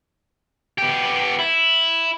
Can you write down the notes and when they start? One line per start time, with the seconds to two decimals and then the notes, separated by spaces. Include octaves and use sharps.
0.78 B3 G4
1.39 E4